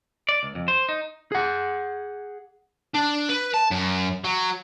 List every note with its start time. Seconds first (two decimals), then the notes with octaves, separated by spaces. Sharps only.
0.29 D5
0.43 C#2
0.55 F2
0.68 C5
0.89 D#4
1.32 G#4 F#5
2.94 D4
3.29 B4
3.54 A5
3.71 F#2
4.24 F#3